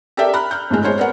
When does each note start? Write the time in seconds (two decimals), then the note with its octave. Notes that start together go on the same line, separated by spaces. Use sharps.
0.17 G4 A4 A#4 D5 E5 G5
0.33 A#5 B5 F6 F#6
0.51 F6 G6
0.70 G1 A2 G#3
0.84 G#3 C5 C#5
0.99 B3 A#4 C#5 F#5